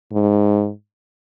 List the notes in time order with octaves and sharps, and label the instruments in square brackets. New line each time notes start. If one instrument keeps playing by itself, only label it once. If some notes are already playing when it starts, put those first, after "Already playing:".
[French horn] G#2